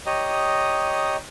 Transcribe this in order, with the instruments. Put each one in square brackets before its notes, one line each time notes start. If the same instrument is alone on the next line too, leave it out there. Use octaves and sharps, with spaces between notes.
[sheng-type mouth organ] G4 C#5 D#5 A#5 D#6